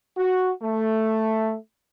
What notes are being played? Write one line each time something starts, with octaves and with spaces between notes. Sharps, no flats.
F#4
A3